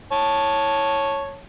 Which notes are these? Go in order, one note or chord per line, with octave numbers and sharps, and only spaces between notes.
C#5 A5